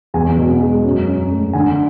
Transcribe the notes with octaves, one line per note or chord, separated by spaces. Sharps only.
E2 G#5
B2
G#3
F#2
F#2
A3
D3 G#5